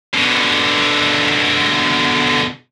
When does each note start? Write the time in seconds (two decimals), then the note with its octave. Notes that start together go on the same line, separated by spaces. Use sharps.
0.14 B2 D3